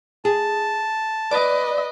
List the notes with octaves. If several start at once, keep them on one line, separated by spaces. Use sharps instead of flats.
G#4 A5
B4 D5 D#5